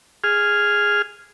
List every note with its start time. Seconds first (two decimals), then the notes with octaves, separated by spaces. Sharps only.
0.24 G#4 F6